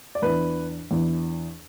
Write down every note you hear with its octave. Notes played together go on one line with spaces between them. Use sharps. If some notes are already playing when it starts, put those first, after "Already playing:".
D5
E2 E3 D4 B4
E2 E3 D4